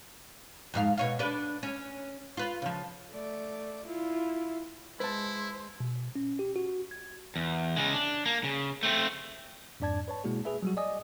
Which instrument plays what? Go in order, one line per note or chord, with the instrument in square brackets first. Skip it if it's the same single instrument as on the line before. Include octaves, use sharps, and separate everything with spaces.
[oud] F2 G#2 F5
B2 C#5 F5
D4 B4
C#4
F4 B4
C#3 F3
[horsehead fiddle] A3 D5
E4 F4
[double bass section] G#3 [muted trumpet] E4 [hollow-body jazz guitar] B4 A5 [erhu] C5
[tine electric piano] B2
C#4
G4
F#4
G#6
[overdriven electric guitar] E2
C#3 G#3
D4
A#3
C#3
A3 C4
[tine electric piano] F2 G#2 D4 D5 A5 G#6
B4 C#5 A5
B2 G#3 A#3 E4 F#4 G#4
G#4 B4 E5
F#3 G3 F#4
D5 D#5 G#5 D#6